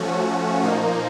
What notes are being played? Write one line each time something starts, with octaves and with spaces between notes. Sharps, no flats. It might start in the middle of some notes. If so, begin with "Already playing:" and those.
Already playing: F3 A3 C#4 F#4
A#2 F3 A#3 D#4